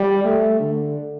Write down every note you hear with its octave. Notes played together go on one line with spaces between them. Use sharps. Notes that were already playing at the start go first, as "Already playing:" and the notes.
Already playing: G3
A3
D3